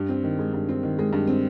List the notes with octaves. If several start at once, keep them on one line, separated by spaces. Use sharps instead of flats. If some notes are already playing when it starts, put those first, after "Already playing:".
Already playing: G2
C4
D#3
G#3
G2
C4
D#3
G#3
G2
C4